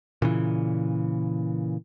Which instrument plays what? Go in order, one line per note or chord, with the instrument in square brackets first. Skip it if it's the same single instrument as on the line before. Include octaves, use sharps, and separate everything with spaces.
[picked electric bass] A#2 C#3 E3